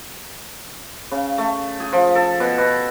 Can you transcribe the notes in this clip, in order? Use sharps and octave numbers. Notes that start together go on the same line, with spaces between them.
C#3
A3
G#4
F3
A4
B2
B2